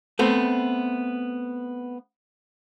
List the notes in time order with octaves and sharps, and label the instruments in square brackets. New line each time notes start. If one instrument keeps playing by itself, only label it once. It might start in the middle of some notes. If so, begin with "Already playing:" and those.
[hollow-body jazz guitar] A3 B3 C4